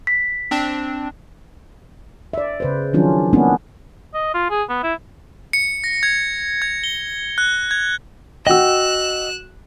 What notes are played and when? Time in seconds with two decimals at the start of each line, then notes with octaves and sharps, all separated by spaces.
0.07 B6
0.51 C4 D4
2.33 D5 E5
2.60 C#3 B4 C5
2.93 D#3 F3 F#3 C#4 D4 F4
3.33 G#3 A#3 B3 C#4 D4 E4
4.14 D#5
4.34 F4
4.50 G#4
4.69 B3
4.83 E4
5.53 C#7
5.84 A#6
6.03 G#6
6.62 G#6
6.84 G7
7.38 F#6
7.71 G#6
8.47 F#4 D#5 F#5 G5 E6 F#6 E7